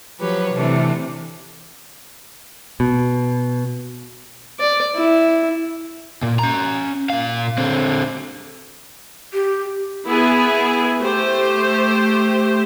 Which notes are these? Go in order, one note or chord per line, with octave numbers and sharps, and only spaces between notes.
F3 F#3 G4 B4 C#5
C3 E3 A3 D4
B2
D5
E4
A#2
C#4 A#5
A#2 F5
D3 C4
G4
B3 E4 G#4 G#5
A3 G4 C5